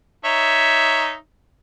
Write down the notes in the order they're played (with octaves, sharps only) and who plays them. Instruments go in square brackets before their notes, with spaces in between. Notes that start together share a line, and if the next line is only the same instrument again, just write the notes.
[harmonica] D#4 C#5 E5